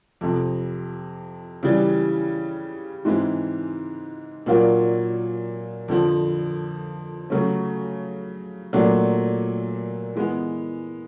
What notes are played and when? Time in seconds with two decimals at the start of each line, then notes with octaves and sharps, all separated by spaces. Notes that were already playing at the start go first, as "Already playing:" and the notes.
0.21 F2 C3 F3
1.63 C#3 E3 G3
3.05 G#2 E3 G#3 C4 E4
4.46 A#2 F#3 A#3 D4 F4
5.88 F2 D3 F3
7.30 C#3 F#3 A3 C#4
8.73 A#2 F#3 A3 D4
10.15 E3 G#3 B3